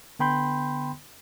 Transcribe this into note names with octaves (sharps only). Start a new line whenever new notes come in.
D3 B3 G5 B5 C6 G6